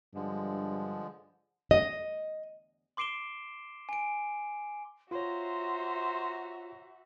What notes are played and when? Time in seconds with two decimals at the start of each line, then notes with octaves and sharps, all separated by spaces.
0.15 G2 D3 F3 G#3
1.71 D#5
2.97 C6 D6 C7 D7 E7 G7
3.89 G#5 D7
5.11 F4 F#4 C5 C#5 E5 A#5 C6